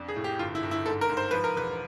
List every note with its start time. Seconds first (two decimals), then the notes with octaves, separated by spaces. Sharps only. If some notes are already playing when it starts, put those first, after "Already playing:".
Already playing: F2 D4
0.08 G#4
0.16 A2
0.24 G4
0.39 G1 F4
0.55 E4
0.63 G1
0.71 E4
0.86 G#2 A4
1.01 A#4
1.10 G#2
1.17 C5
1.31 F3 B4
1.44 A#4
1.56 E1 B4